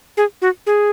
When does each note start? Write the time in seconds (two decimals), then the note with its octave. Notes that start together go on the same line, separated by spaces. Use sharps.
0.17 G#4
0.42 F#4
0.67 G#4